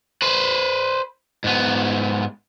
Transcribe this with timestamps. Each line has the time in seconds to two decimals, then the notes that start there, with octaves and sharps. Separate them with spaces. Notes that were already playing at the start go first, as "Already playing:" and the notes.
0.22 B4 C5
1.44 G#2 B3